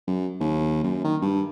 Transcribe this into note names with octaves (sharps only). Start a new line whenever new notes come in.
F#2
D#2
F#2
D#3
G2